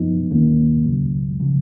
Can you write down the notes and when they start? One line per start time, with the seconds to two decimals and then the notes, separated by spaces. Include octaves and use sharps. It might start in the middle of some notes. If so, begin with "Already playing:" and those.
Already playing: F#2 F3 B3 D#4
0.30 D#2 D#3 A#3 C#4
0.84 C#2 C#3 F#3
1.40 C#3 F3